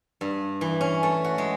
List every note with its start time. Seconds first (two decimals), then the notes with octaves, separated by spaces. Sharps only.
0.21 G2
0.61 E3
0.81 C#4
1.03 A3
1.24 F#4
1.38 G#3